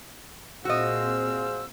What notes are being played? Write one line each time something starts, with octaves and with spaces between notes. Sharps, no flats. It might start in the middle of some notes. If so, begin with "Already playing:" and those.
A#2 C4 F#4 G#4 C5 D#5 F5 E6